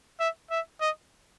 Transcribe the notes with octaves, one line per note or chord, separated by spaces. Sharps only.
E5
E5
D#5